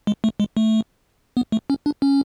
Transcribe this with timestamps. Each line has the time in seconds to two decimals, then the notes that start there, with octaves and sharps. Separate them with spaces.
0.07 G#3
0.24 A3
0.40 G#3
0.57 A3
1.37 B3
1.52 A3
1.70 C#4
1.86 D4
2.02 C#4